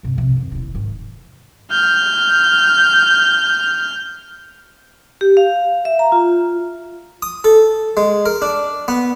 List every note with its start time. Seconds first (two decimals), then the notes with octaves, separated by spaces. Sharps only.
0.03 G2 C3
0.16 C3 F3
0.37 F2 D#3
0.52 D#1 E4
0.75 G#2 D#3
1.71 F6 G6
5.21 G4
5.37 F5
5.85 E5
5.99 A#5
6.12 F4
7.22 D#6
7.44 A4
7.97 G#3
8.26 A#4
8.42 D4
8.88 B3